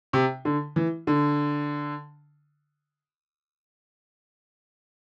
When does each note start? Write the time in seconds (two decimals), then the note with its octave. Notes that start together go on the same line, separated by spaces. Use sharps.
0.13 C3
0.45 D3
0.76 E3
1.07 D3